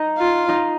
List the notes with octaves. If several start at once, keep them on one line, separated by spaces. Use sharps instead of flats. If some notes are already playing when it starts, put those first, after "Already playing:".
Already playing: D#4 D#5
F4
D#4 D#5